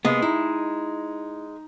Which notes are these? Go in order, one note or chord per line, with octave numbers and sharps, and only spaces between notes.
C3 G#3 A#3 B3
D#4 E4